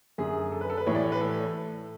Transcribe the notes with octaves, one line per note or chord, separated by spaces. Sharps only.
F#2 D3 G#4
A4
B4
A4
B4
A2 E3 C#5
D5
C#5
B4
A4